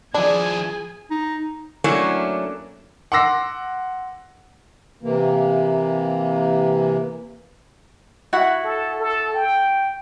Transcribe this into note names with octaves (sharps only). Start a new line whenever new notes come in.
F3 D4 E4 G#4 G#5
D#4
F#3 A3 A#3 C#4 D4 E4
F#5 C6 D6 E6 A#6 C7
C3 E3 A#3
E4 F#4 F#5
A4
A4
G5